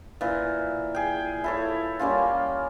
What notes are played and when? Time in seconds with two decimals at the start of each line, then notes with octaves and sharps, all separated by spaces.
0.21 A#2 E3
0.95 G#4 G5
1.44 E4 A4 C#5
1.99 G3 A#3 C#4 F4